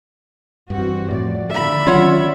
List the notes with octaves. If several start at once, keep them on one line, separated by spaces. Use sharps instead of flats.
G2 E3 C4 F#4
F2 A2 D5
D3 D5 E5 B5
D#3 F#3 C#4 F4 C#5 F#5